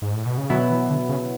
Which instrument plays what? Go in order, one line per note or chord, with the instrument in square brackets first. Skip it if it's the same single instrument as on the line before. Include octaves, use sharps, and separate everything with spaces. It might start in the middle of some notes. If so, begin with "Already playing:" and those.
[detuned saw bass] G#2
A2
B2
C#3
[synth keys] B2 F#3 B3 E4 [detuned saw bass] D3
[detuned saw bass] E3
D3
C#3